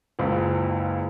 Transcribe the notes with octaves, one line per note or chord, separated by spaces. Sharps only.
F#1 C#2